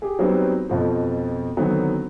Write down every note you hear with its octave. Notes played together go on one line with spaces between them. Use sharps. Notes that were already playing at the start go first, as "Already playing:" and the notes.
G4 G#4
F#3 G3 B3 C4 D#4 B4
F2 B2 F3
D3 D#3 F#3 B3 C4 D#4